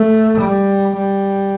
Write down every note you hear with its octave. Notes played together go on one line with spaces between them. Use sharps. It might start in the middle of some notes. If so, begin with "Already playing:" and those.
Already playing: A3
G3
G3